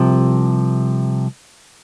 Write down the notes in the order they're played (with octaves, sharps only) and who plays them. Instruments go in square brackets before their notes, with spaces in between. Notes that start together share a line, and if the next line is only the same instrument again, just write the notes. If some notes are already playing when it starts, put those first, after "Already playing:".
Already playing: [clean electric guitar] C2 C3 F3